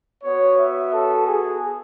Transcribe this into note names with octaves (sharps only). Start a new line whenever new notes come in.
B3 F#4 C#5
E5
A4
G#4